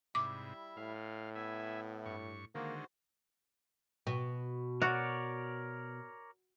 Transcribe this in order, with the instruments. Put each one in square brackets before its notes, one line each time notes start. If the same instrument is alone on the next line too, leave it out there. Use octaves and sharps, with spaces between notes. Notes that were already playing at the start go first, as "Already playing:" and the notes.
[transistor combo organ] G#2 C3 [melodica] G3 E4 E5 [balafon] D6
[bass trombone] A2 [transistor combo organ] F5
[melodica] B3 E4 [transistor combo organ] E5 G#5
[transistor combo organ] G2 C#6
[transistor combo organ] D3 D#3 G#3 [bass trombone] A#3 [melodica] F#4 C5
[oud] B2
[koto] F#4 [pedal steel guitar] A#4 C#5 D5